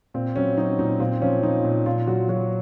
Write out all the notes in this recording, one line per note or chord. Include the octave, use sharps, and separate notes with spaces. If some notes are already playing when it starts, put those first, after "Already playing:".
A#2 C4
F#3 C#4
F#3 D#4
A#2 D#4
A#2 C4
F3 C#4
F3 D#4
A#2
A#2 F4
F#3 F#4
F#3 F#4